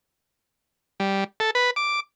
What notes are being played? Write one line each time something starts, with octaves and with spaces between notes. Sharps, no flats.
G3
A4
B4
D6